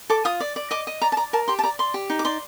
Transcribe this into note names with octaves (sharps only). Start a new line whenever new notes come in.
A4 D6
F4 D#6
D5
D5
D#5 D6
D#5
D5 A#5
A5
D5 A#5
A#4 A5
G4 C6
A5
D5 A#5
D5 C6
G4
D#4
D6
D5 C6